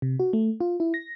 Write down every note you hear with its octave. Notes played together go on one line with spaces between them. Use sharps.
C3
F#4
A3
F4
E4
A#6